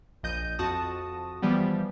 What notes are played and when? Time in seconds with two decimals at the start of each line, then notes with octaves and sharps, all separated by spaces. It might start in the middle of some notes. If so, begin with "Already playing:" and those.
0.23 A#1 D#5 G6 D#7
0.59 F2 F#4 A5 D#6 A#6
1.42 E3 F3 G3 B3